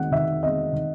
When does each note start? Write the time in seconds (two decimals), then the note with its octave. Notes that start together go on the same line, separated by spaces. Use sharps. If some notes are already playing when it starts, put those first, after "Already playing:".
Already playing: D#3 G#3 C4 F#5
0.12 D#3 E5
0.42 G#3 C4 D#5
0.73 D#3